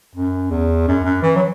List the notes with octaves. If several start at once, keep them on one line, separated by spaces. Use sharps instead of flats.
F#2
E2
F#2
F#2
E3
F#3